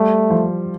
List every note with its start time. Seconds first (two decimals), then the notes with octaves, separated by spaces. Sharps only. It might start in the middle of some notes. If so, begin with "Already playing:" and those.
Already playing: G3 A3
0.30 F3